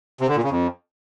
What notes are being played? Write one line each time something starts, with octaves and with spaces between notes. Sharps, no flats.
C3
D3
A#2
C#3
F2